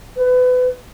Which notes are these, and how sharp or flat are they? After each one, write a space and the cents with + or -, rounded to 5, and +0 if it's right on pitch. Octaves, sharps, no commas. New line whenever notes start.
B4 +30